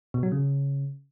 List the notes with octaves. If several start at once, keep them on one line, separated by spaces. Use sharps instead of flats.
B2
F#3
C#3